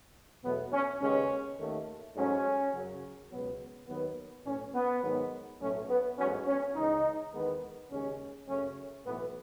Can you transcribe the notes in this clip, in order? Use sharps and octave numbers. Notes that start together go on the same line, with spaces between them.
E2 B2 F#3 A3 B3
C#4
D#2 C#3 G#3 B3 C#4
D#2 D#3 A3
G#2 F#3 A3 C#4
F#2 C#3 F#3
C#2 B2 F#3 B3
D#2 D#3 F#3 B3
B1 A2 E3 C#4
B3
G#2 D#3 F#3 B3
B1 A2 F#3 A3 C#4
B3
A1 G#2 F#3 B3 C#4
C#4
C#2 C#3 E3 D#4
E2 D#3 G#3 B3
D#2 C#3 G#3 C#4
F#2 C#3 F#3 A3 C#4
B1 A2 E3 B3